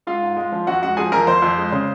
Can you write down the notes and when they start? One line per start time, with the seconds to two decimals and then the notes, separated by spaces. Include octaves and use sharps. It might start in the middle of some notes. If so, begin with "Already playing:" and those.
0.07 G#3 F4 F5
0.22 G#2
0.37 G#3
0.52 F3
0.67 F2 F#4 F#5
0.83 G#3 F#4 F#5
0.97 F3 G#4 G#5
1.12 F2 A#4 A#5
1.27 F2 C5 C6
1.42 F2
1.57 G#3
1.72 C#3